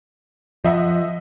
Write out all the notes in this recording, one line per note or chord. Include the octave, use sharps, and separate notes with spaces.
F3 D#5 E5 F#5